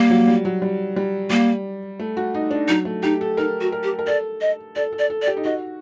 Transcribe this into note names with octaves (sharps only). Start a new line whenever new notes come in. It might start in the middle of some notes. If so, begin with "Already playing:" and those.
Already playing: G3 A#3
F#3
G3
F#3
G3
G3
G3 A#3
A3
F#4
D#4
D4
F#3 D#4
A3
D#4 G4
A4
D#4 A#4
F#4
A#4
G4
A#4
A4 D5
D#5
A4 D5
A4
D5
A4
D5
G4
D#4
F#4 D#5